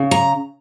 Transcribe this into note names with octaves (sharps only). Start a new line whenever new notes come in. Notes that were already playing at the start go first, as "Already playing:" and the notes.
Already playing: C#3
A#5